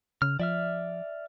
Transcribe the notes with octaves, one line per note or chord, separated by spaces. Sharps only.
C#3 F6
F3 D5 E5 F6